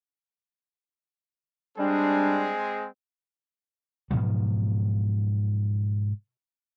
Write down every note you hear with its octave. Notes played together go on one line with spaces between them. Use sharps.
G3 G#3 C4 D4 G#4
G#2 B2 F3 F#3